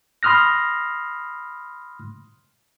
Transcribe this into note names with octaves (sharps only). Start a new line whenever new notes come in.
B5 C6 D#6 F6 F#6 A#6